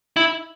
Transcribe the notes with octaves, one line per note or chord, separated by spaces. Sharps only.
E4